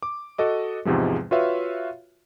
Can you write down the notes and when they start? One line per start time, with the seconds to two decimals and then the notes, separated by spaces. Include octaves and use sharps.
0.03 D6
0.38 F#4 A4 D#5 D6
0.85 E2 G#2 C3 F3 G#3
1.31 F4 F#4 B4 C#5 E5 F5